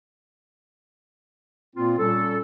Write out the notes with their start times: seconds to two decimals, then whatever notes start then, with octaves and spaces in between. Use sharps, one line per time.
1.75 A#2 A#3 C4 F4
1.98 A#2 G3 C#4 A4